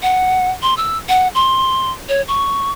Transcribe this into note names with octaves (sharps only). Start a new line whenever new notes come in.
F#5
C6
E6
F#5
C6
C#5
C#6